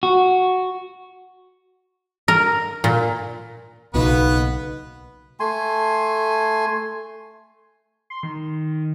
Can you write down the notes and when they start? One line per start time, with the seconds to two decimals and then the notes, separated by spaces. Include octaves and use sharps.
0.03 F#4
2.28 A#4
2.84 A#2
3.94 B1 C#3 A#3 B3 D#4 F#4 B4
5.40 A3 G#5 C6
8.10 C6
8.23 D#3